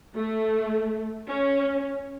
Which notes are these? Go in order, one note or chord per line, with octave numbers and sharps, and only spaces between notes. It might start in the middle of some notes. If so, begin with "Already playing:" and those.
A3
C#4